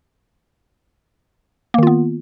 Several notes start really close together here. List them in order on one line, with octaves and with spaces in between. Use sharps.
A#3 D#3 F4 B3